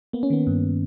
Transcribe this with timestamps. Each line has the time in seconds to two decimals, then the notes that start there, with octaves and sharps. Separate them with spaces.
0.13 A#3 B3
0.23 C#4
0.30 D#3 B3
0.47 G2